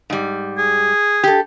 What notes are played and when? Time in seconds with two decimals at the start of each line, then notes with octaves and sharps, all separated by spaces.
0.10 G#2 G3
0.58 G#4
1.24 G4 A4